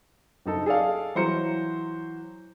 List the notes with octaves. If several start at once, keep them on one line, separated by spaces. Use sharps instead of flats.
F#1 D#4 A4
G#4 A4 D5 F5
E3 F#3 C5 A#5 C#7